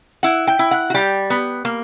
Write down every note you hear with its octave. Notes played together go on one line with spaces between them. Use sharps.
E4 F#5
G5
E4
F#5
F#4
G3 G4
B3
A#3